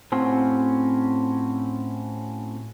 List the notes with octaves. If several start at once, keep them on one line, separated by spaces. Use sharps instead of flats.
A2 C4 C#4 F4 F#4